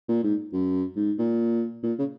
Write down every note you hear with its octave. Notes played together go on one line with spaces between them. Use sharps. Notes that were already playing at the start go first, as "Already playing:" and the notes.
A#2
G#2
F#2
G#2
A#2
A#2
C#3